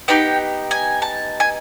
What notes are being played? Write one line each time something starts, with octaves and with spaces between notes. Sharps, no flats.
B3 D#4 G4 G5
G#5
A5
G#5